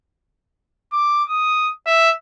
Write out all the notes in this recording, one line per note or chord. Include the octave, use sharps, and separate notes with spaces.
D6
D#6
E5